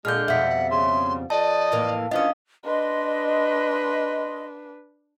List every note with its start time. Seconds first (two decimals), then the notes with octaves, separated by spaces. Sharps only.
0.05 A#2 D3 G#3 F6 G6
0.28 F2 B2 G3 E5 F#5 B6
0.71 C#3 C6
1.30 F2 D5 D#5 A5
1.72 A2 E3 A#3
2.11 A#2 E3 F3 C#4 D4 D#5 F5 D#6
2.64 D4 B4 D#5 C6